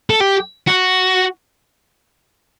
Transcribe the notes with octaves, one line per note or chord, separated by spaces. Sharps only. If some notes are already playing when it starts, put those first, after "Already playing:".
A4
G4
F#4